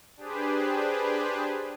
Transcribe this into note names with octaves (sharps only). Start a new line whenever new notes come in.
D4 G4 G#4 B4 C5